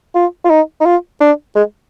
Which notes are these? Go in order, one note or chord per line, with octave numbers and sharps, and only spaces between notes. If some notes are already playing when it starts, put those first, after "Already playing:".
F4
F4
D#4
D#4
F4
D4
G#3